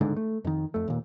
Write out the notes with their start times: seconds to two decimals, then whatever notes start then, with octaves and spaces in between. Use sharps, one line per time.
0.01 G1 C#2 G#2 D3
0.16 A3
0.44 F2 D#3
0.74 F2 A3
0.88 D#2 A#2